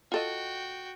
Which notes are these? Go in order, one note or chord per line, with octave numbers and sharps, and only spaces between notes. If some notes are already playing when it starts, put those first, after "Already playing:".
F4 F#4 A4 D#5 G5